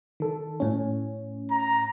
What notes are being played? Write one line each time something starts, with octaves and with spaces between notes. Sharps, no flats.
D#3 A4
A2 C#4
A#5